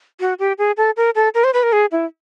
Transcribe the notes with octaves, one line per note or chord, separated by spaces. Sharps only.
F#4
G4
G#4
A4
A#4
A4
A#4
C5
B4
A#4
G#4
E4